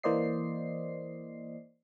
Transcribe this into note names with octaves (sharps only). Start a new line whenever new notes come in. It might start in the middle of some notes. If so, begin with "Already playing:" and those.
E3 A#3 C5 D5 D#5 C7